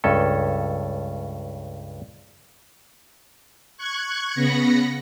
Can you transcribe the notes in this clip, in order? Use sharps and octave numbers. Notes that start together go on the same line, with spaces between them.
C#2 G2 C#4 A4
C#6 F#6 G#6
C#3 B3 B5 A#6 C#7